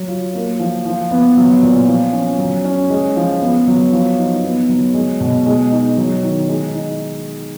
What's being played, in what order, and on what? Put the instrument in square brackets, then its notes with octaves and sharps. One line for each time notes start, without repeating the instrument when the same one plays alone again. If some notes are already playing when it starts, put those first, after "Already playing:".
Already playing: [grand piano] F#3
F4
A#3
F3
F3
B3
F#3
A#2
F3
C#4
F#3
C#4
G#3
F3
B3
F#3
F3
D#4
B3
F#3
G#3
B2
G#3
D#4
F#3
D#3
G#3
D#4